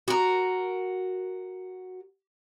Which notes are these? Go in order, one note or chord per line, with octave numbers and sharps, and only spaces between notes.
F#4 A#4